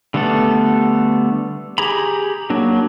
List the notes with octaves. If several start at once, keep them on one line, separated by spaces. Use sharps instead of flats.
D3 G3 A3 B3 A4
G4 G#4 A#5 B5
F#3 A#3 D4